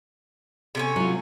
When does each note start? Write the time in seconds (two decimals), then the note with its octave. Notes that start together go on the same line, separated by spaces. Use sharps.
0.75 C3 A3 C#4
0.96 F#3 F4